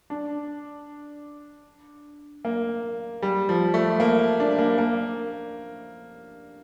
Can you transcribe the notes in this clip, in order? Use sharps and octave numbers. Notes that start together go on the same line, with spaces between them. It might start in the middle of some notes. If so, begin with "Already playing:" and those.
D4
A#3
G3
F3
A3
A#3
D4
A#3
A#3